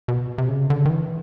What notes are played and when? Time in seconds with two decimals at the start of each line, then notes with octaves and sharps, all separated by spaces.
0.08 B2
0.38 C3
0.49 C#3
0.70 D3
0.85 D#3
0.90 E3